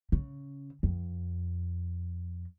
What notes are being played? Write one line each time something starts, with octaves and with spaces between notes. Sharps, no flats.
C#3
F2